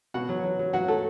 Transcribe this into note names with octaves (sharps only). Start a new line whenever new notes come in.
B2 F#4 F#5
F#3
F#3
F#3
F#3 F#4 F#5
A3 A4